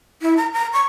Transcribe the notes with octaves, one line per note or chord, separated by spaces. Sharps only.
E4
A#5
A#5
C#6